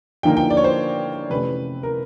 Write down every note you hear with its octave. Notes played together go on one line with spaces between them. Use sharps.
D3 F3 A#3 D#4 G5
G5
D5
C#5
C5
F2 C3 E3 A3 C#4 B4
A#4